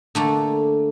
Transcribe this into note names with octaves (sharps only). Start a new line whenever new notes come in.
D3 A3 A#3